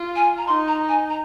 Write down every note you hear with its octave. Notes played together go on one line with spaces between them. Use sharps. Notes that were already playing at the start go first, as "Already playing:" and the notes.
Already playing: F4
G#5
A#5
D#4 C6
A#5
G#5
A#5